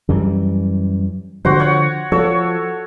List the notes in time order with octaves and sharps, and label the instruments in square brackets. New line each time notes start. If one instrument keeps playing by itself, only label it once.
[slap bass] F#2 E3 G3
[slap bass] D3 F3 [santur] F#4 C5
[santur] C#5 F#5
[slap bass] F3 [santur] A4 C#5